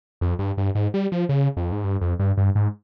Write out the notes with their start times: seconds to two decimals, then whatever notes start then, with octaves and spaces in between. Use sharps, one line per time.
0.21 F2
0.39 G2
0.58 G2
0.75 G#2
0.94 G3
1.12 F3
1.29 C#3
1.57 F2
1.72 G#2
1.84 G2
2.01 F2
2.19 G2
2.37 G2
2.55 G#2